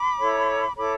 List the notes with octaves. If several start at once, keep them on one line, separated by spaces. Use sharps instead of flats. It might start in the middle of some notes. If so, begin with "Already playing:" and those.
Already playing: B5 D6
E4 A4 C#5
E4 A4 C#5 B5 D6